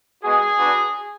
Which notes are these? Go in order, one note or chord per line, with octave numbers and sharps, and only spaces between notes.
G#3 B3 F#4 G#4
B3 D4 F#4